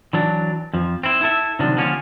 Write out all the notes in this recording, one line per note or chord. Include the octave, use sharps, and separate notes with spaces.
E3 F#3 D4
F2 F3
C4 E4
E4 A4 E5
C3 D#3 F3 F#3 D4
D3 F3 G3 A#3 C#4